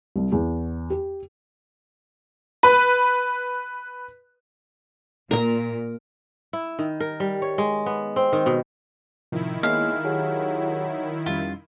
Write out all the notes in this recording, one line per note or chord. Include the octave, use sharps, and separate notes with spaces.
C2
E2
G4
B4 B5
A#2 A#4 A#5
E4
D#3
A#4
G3
C#5
G#3
B3
C4
D#3
B2
A2 C3 D#3 F3 E4
G#3 A#3 B3 C#5 F5
F#3 G4 G#4
F2 G3 C#4 F4